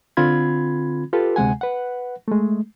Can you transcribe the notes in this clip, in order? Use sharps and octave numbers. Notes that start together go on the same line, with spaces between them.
D3 C4 F4 B5 G#6
F4 G4 A4 B4
D2 C3 G#3 F#5 G#5
B4 F#5
G#3 A3